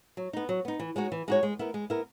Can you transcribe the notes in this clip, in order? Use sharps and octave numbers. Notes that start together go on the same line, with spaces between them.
F#3
B3 D#4
F#3
B3 D#4
E3
G#3 D#4 F#4 C#5
E3
G#3 D#4 F#4 C#5
G#3
B3 E4 A#4
G#3
B3 E4 A#4